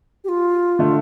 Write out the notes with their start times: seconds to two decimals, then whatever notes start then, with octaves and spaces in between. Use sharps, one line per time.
0.24 G4
0.29 F4
0.79 D3 A3